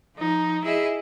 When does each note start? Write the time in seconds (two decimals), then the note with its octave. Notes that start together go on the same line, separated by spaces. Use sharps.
0.15 F3 D#4
0.64 E4 G#4 D#5 E5